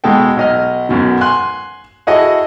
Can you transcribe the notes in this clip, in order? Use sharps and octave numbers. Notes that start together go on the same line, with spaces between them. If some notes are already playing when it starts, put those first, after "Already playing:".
B2 G#3 F#4 A4 G5
B1 D#5 F6
B1 F#2 B2
G#5 C6 F#6
E4 F#4 G#4 A4 D#5 F#5